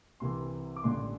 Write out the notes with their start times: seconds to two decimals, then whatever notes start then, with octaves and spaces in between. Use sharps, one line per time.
0.20 C2 C3 E3 C6
0.76 D6
0.84 A1 G2 D3 C6